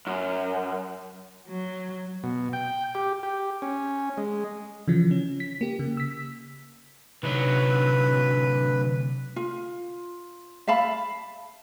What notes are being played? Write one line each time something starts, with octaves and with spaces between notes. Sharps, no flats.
F#2
F#3
B2
G5
G4
G4
C#4
G#3
C#3 E3 F3
C#4
B6
A#3 G4
C#3
E6 B6
D2 C3 F#3 D#4 B4 C#5
F4
E5 F5 A5 B5